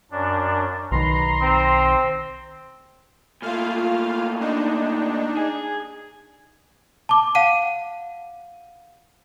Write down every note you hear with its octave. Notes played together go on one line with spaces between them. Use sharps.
F#2 D4
B1 D#3 B4 A#5 C6
C4
A#2 A3 F4 F5
D4 D#4
G#4
A5 D6
F5 F#5 D#7